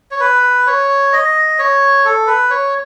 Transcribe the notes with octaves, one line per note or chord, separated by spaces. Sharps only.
C#5
B4
C#5
D#5
C#5
A4
B4
C#5